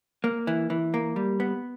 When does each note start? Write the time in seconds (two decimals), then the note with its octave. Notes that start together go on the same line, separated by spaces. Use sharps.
0.24 A#3
0.47 E3
0.70 E3
0.94 A#3
1.16 G3
1.40 B3